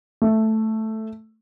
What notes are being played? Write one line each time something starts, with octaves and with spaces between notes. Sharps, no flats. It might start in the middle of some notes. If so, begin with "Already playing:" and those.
A3